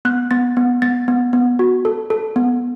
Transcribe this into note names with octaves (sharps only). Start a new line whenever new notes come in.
B3 F#6
B3 A6
B3
B3 A6
B3
B3
F#4
A4
A4
B3